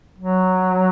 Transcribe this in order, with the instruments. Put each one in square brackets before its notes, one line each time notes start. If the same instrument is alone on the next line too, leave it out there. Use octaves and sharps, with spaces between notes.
[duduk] F#3